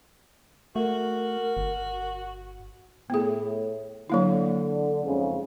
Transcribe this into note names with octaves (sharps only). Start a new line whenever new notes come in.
A3 F#4 A#4
G1
A2 B3 G#4
D3 F#3 A#3 E4
F2 G#2 C#3